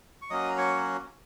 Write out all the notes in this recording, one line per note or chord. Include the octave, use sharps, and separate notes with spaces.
C#6
F#3 A#3 C#4 F#4 D#5 D#6
A#5
C#5 C#6